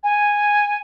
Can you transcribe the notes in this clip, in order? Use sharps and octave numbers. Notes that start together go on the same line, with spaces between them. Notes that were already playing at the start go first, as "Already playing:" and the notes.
G#5